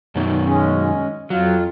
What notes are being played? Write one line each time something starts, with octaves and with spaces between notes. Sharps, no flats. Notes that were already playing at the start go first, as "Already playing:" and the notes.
F#2 B2 D#3
G#3 C#4
F2 F#3 F4